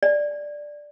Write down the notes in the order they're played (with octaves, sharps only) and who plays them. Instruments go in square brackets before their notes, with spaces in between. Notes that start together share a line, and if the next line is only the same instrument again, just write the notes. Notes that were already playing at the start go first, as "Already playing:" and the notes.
[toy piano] D5